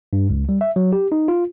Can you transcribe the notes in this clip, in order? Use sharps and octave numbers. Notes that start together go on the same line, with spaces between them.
G2
C#2
G3
E5
F#3
G4
D#4
F4